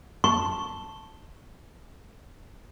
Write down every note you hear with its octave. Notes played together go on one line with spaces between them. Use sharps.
A5 C#6